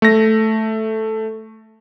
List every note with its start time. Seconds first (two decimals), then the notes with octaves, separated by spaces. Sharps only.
0.02 A3 A#6